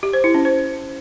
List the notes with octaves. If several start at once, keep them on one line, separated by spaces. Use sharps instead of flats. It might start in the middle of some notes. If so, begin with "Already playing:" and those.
G4
C5
E4
C#4
C5